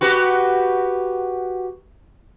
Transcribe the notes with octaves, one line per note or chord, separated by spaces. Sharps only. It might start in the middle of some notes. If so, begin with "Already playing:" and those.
F#4 G4 B4